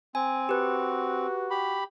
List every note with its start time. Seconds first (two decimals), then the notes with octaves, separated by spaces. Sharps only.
0.15 C4 G#5
0.49 F#4 G4 B4
1.50 G4 B5